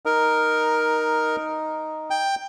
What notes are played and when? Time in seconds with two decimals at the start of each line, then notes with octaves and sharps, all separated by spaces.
0.06 D#4 A#4
2.10 G5